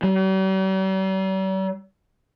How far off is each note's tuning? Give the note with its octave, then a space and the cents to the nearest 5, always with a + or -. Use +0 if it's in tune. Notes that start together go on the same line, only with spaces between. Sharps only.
G3 -45